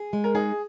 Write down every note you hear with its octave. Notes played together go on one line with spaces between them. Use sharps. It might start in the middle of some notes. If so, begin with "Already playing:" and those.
Already playing: G#4
G#3
A#4
D#4 G#4